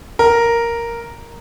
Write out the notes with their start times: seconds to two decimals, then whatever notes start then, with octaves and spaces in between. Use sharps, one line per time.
0.19 A#4